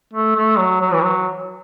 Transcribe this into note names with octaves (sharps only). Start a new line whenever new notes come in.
A3
A3
F#3
F#3
E3
F#3